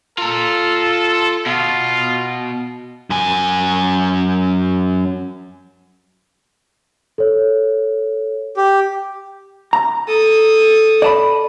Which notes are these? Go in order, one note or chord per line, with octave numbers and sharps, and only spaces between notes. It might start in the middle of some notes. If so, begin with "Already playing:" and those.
F4 A4 A#5
B2 F4
F#2 G#5
A4 C#5
G4
A#5
A4 D#6
D5 A5 B5